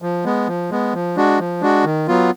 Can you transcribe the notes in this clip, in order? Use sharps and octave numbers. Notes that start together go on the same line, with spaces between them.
F3
G#3 B3
F3
G#3 B3
F3
G#3 D4 F#4
F3
G#3 D4 F#4
D#3
F#3 B3 F4